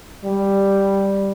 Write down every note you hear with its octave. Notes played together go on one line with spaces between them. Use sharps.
G3